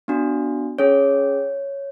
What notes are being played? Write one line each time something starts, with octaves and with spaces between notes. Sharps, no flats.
B3 D4 F#4
C#4 G#4 C#5